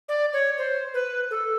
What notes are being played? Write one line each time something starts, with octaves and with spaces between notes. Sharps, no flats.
D5
C#5
C5
B4
A4